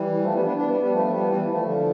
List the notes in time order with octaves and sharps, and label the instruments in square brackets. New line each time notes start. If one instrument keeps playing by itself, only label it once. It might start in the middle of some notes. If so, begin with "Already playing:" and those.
Already playing: [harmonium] E3 G3
F3 A3
G3 B3
B3 D4
B3 D4
G3 B3
G3 B3
F3 A3
G3 B3
E3 G3
F3 A3
D3 F3